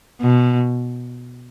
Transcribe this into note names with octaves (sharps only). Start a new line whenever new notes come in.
B2